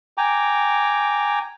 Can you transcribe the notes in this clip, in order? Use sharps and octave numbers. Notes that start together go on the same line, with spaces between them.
G5 G#5 A#5 D6